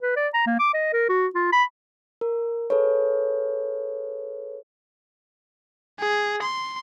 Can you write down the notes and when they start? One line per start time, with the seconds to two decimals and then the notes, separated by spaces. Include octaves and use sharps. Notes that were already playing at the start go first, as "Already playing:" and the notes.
0.02 B4
0.16 D5
0.34 A#5
0.47 A#3
0.59 D6
0.74 D#5
0.93 A#4
1.09 F#4
1.35 F4
1.53 B5
2.21 A#4
2.70 G#4 A4 B4 C#5
6.00 G#4
6.42 C6